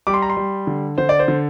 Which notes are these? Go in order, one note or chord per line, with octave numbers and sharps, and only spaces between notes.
G3 D6
C6
A#5
C6
G3
D3
D3 C5
D5
C5
D3